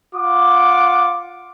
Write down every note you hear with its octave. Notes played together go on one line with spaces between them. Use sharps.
F4 F#5 D6